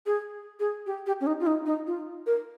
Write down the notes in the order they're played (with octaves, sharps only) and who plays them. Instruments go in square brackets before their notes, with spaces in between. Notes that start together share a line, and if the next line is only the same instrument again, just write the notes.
[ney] G#4
G#4
G4
G4
C#4
D#4
F4
D#4
D#4
F4
A#4